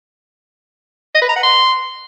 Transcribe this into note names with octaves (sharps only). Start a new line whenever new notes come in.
D#5
B4
A#5
F#5
C6